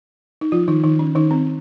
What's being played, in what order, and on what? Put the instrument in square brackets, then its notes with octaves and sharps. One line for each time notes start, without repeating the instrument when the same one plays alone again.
[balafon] D#4
F3 F4
D#3 D#4
D#3 D#4
C#4
D#3 D#4
C4